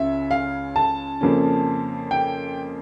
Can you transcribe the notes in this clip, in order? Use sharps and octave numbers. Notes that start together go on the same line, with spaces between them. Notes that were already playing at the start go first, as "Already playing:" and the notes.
Already playing: C#2 C#3 C#4 E5
F5
A5
F2 C#3 F3 A#3 C#4
G5